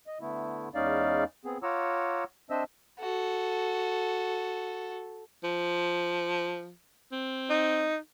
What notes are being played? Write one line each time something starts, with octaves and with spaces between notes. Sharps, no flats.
D#5
D3 A3 B3 E4
E2 G#3 C#4 D#4 D5 F5
B3 C4 G#4
F4 C#5 F#5 A#5 D6 E6
C4 D4 C5 D#5 E5 E6
F#4 A4
F3
C4
D#4